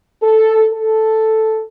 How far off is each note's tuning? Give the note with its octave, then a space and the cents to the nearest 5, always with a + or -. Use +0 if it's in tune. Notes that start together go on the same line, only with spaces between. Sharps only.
A4 +0
A4 +0